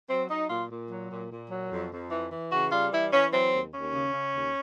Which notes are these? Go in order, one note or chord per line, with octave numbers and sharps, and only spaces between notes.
F#3 C4
F#3 D#4
A#2 F4
A#2
F#3
A#2
A#2
F#3
F2
F2
E3
E3
C#3 F#4
G3 F4
E3 E4
E3 C#4
F#3 C4
D#2
D#2 C#4
C#3
C#3
D#2